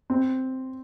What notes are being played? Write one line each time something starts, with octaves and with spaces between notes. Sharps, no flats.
C4